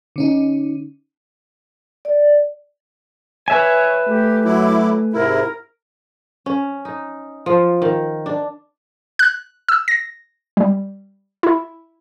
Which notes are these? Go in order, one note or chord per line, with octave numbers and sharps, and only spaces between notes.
D3 C#4 D#4
D5
B4 C#5 E5 G#5
A3 G4
F#3 E4 D6
G#2 C3 E4 A#4
C#4
D#4
F3
D#3
D4
F#6
E6
A#6
G3
E4